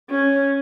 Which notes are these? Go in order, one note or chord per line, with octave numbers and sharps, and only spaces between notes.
C#4